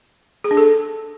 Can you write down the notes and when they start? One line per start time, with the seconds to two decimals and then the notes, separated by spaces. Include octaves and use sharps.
0.44 G#4
0.51 D4
0.57 A4